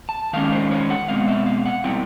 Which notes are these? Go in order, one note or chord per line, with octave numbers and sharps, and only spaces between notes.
A5
D#3 G#3 C#4 F5
C5
C#5
F#5
B2 G#3 C4 F5
E5
F5
F#5
B2 G3 C4 E4 G5